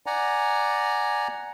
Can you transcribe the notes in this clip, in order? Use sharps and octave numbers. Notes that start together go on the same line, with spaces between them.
D5 F#5 G#5 A#5